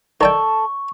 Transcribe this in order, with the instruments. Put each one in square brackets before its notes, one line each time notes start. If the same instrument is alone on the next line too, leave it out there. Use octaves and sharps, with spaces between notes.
[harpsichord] D#3 D5 G5 [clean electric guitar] A4 [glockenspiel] C#6